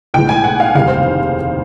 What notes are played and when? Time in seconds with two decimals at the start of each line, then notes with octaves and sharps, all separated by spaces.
0.14 B1 A2 E3 G#3 G5
0.29 G#5
0.44 F#5
0.60 F5
0.75 F1 D#2 C#3 E3 G3 F5
0.88 C5